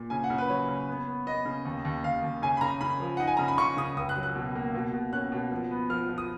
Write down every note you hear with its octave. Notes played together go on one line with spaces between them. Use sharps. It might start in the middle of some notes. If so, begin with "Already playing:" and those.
Already playing: A#2
C#3 G#5
F#5
C#3
B4
F#3 C#5
C#3
B3
B3
B3 D#5
C#3
D#2
D#2
D#2 F5
D#2
C#3 G#5
B5
C#3 A#5
C#3 B5
F3
D#4 F#5
G#5
C#3 A#5
B5
C#3 C#6
C#3 D#6
C#2 D#6
F#6
F#3
F#6
B2
A#3
B2
B2
C#4 F#6
B2
F3
B3
F3 F6
F3
D#6